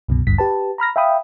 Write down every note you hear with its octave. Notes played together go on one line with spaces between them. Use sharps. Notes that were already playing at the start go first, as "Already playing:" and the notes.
C2 F#2 B2
A1 D2 G2 B6
G4 B4 A5
A#5 B5 F6 A#6
E5 F5 G5 B5 D#6